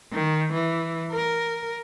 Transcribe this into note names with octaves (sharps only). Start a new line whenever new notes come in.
D#3
E3
A#4